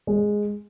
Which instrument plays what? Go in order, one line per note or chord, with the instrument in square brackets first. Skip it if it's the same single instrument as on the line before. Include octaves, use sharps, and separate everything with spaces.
[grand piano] G#3